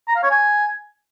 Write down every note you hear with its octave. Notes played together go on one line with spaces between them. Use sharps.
A#5
F5
C#5
G#5